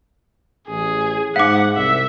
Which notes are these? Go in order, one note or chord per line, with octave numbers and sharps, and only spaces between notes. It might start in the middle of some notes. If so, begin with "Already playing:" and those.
A1 G#4
G#2 F5 F#5 D6
C2 E5